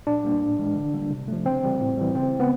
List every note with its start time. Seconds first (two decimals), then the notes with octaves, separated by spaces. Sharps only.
0.07 A#2 D4
0.24 G3 A#3
0.42 A2
0.59 E3 G#3
0.76 D3
0.94 G3 A#3
1.11 C3
1.28 F3 A3
1.46 C#3 C4
1.63 E3 G3
1.81 A2
1.97 E3 G3
2.15 C#3 C4
2.33 E3 G#3
2.40 B3